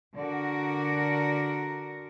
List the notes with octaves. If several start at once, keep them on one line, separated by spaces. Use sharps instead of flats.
D3 F#4 A#4